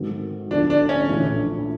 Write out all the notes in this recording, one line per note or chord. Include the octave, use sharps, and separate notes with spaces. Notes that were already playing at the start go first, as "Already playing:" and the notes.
Already playing: G#2 D#3 F#3 A3 C4
D2 D3 F3 D4
D4
C#4
A#1 A2 E3